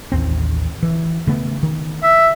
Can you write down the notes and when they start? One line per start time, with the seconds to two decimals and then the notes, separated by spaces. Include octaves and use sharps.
0.12 A1 D#2 C4
0.83 E3
1.27 C#3 A3 B3
1.63 D#3
2.03 E5